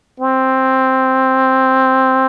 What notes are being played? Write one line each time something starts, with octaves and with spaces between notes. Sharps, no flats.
C4